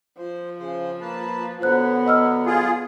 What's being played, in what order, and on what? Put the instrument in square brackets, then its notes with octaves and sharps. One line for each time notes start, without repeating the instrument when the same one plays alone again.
[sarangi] F3 [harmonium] C5
[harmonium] C#3 C5
A#3 B4 A5
[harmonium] D3 F#3 [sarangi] B3 [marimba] C5 F#6
[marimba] D#5 E6 F6
[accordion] F4 G#4